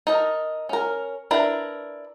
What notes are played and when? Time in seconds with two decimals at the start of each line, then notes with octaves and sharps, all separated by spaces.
0.07 D#4 A4 A#4
0.69 C#4 A#4
1.31 D4 E4 A#4 B4